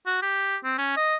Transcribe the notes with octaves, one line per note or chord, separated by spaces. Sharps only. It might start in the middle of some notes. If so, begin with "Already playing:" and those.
F#4
G4
C4
C#4
D#5